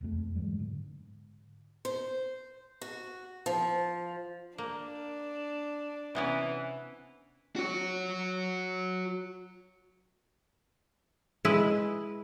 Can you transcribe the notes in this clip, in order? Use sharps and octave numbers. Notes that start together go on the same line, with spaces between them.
E1 F2 A3
G2 E3 F#3 G#3
G#2 D3
C5
F#4
F3
A#3 D4
C3 E3 B3 C#4
F#4 C#5
G#3 E4 B4